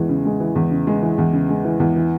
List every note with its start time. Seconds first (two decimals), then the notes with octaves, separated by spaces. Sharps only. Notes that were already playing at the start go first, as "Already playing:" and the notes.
Already playing: E2 E3 G#3
0.09 C#3
0.25 G#3
0.40 E3
0.55 E2
0.71 C#3
0.87 G#3
1.02 E3
1.18 E2
1.33 C#3
1.49 G#3
1.64 E3
1.80 E2
1.96 E3